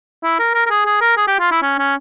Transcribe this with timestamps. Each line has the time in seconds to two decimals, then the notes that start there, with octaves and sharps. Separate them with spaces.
0.24 E4
0.39 A#4
0.54 A#4
0.66 A#4
0.70 G#4
0.86 G#4
1.01 A#4
1.17 G#4
1.27 G4
1.40 F4
1.51 E4
1.62 C#4
1.79 C#4